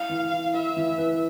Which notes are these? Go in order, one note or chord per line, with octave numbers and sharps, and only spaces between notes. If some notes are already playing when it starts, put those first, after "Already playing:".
Already playing: E4 F5
E3
E4
E4 E5
E3
B4